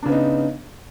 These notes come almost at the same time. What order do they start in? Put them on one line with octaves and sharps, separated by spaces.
D4 C#3 B3 D#4